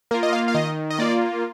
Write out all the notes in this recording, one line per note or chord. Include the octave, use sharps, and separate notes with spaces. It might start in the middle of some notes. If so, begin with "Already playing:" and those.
A#3 F4 A#4
D#5
F5
F5
D#3 D#5
D#5
A#3 F4 D5